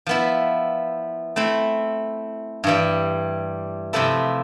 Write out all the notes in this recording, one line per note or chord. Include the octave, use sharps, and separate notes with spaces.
F3 B3 E4
A3 C4 E4
G2 E3 G3
C3 F3 A3 E4 A4